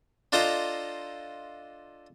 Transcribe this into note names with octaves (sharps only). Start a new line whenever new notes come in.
D4 F4 A4 C5 D#5 A#5